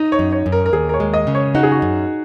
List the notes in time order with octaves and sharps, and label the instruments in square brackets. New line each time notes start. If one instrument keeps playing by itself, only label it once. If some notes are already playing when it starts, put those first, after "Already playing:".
Already playing: [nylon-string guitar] D#4 [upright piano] D#5
[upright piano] C#5
[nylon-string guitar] F#2
[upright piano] C#5
[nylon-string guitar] F#2
[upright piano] A#4
A#4
[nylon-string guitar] D#2 [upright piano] G#4
[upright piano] A#4
C#5
[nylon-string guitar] G#3
[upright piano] D#5
[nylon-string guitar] C#3
[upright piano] C#5
[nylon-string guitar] D#4 [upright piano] F#4
[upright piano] G#4
F#4
[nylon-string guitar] F#2